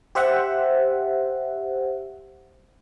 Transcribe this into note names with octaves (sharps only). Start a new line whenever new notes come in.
G4 C5 E5 F#5